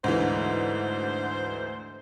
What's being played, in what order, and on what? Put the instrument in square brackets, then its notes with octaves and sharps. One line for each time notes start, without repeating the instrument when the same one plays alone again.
[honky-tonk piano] D2 D3 E3 [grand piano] G#2 [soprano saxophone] C5